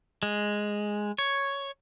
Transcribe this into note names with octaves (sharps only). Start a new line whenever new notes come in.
G#3
C#5